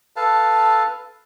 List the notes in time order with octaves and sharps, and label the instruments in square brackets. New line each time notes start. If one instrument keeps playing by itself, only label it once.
[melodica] A4 B4 F5 A5